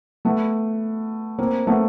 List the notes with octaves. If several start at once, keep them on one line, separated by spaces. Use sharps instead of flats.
A3 B3
A#3 C4
A3 B3